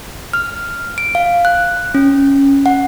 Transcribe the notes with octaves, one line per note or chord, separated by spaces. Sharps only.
F6
D7
F5
F#6
C#4
F#5